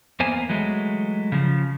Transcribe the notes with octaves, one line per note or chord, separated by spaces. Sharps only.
E2 A#3 B3 C5 G#5
E3 F#3 G#3 A3
C#3 F3